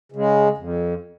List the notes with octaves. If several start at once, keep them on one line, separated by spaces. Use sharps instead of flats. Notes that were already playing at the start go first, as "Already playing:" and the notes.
C#3 G#3
F2